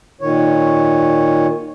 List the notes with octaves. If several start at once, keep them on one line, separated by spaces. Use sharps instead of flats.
A#2 D#3 C#5